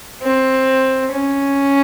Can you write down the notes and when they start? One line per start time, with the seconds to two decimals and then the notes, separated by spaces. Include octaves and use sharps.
0.22 C4
1.12 C#4